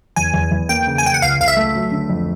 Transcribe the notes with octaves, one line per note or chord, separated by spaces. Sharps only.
E2 G#5
E2
E2
A#3 G5
C#3
G#5
C#3 G5
F#5
C#2 F5
C#2 F5
E5
A3
F#3
D3
F2